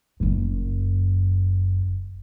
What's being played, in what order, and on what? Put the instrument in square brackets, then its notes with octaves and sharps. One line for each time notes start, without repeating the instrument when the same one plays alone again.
[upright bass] F#1 F#2